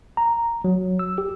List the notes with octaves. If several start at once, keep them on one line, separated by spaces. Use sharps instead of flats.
A#5
F#3
E6
G4